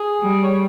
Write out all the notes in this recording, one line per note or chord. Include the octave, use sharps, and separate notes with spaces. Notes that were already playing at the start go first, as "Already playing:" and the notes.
Already playing: G#4
G3
C#5